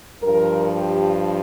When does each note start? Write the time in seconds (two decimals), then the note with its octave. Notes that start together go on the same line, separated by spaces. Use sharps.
0.22 G2 F3 A#4
0.70 G4